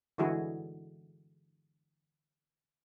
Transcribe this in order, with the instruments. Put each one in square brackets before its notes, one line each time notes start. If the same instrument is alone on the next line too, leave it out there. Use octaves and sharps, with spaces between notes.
[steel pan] D3 E3 G#3 E4 F#4 G#4